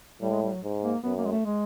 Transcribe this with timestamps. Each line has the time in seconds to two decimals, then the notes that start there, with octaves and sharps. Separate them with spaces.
0.22 A2 G3
0.32 G#3
0.42 G3
0.53 F#3
0.64 G#2
0.83 A#3
1.04 F#2 B3
1.18 A#3
1.25 G#3
1.32 A3
1.45 G#3